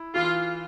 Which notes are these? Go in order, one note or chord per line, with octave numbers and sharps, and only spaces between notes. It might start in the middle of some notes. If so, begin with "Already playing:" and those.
Already playing: E4
E3 F4